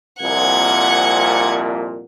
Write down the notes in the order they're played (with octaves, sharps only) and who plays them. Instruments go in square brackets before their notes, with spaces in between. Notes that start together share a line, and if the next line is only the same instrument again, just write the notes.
[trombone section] C2 F2 A#2 [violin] F#5 G#6